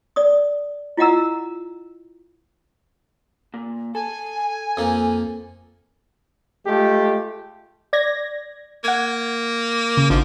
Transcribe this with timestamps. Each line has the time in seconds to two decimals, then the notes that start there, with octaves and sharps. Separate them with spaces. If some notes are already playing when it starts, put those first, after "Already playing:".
0.16 D5 D#6
0.97 E4 F4 D#5 F#5 A#5 E6
3.54 A#2
3.95 A4 G#5
4.77 F2 A#3
6.67 G#3 A3 F4 G4
7.93 D5 G#6 A#6
8.84 A#3 F#5 G#6
9.97 C#3
10.10 G#1 D3 F3